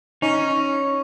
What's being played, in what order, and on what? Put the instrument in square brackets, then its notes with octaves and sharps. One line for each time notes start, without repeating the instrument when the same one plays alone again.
[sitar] C#4 [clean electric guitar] D#4